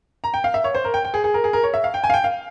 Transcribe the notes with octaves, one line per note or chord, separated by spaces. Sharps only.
A#5
G5
F5
E5
C#5
C5
A#4
G5
G5
G#4
G#4
A#4
G#4
A#4
C#5
E5
F5
G5
G#5
F5
G5
F5